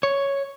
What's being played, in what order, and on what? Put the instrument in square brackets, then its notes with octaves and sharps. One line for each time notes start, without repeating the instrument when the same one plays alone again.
[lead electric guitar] C#5